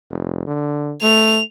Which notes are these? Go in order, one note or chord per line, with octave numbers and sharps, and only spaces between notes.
F1
D3
A3 F7